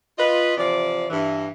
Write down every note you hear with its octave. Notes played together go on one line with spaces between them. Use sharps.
F4 B4 D#5
C3 E3 F3 D5
G2 E3